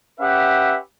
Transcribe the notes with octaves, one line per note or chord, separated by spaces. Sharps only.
C#4 G4 B4 E5 F#5